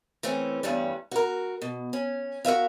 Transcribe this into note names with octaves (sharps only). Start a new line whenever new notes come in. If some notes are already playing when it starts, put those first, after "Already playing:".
E3 A3 C4 C#4
E2 G2 G3 C#4 D4
F#4 A#4
B2
C#4
F#4 A#4 E5 F5